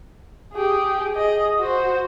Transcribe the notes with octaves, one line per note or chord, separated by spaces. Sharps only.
G4 G#4
G#4 D#5
F#4 C5